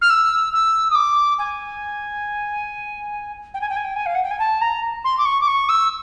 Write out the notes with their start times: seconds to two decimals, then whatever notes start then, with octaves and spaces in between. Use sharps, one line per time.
0.01 F6
0.10 E6
0.53 E6
0.91 D#6
0.95 D6
1.38 G#5
3.54 G5
3.61 G#5
3.69 G5
3.76 G#5
3.84 G5
3.96 G#5
4.06 F5
4.15 F#5
4.23 G5
4.31 G#5
4.39 A5
4.61 A#5
5.04 C6
5.18 D6
5.25 C#6
5.41 D6
5.47 C#6
5.69 E6